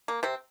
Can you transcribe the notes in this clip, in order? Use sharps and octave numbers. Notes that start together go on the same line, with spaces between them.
A#3
C3 C4